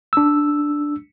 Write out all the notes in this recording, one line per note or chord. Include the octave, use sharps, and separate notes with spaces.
D4 E6